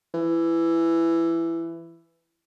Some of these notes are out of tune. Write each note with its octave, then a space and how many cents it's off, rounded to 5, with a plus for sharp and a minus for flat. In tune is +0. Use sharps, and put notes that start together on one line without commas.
E3 +15